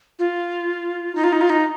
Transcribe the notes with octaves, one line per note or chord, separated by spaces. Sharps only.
F4
D#4
F4
D#4
F4
D#4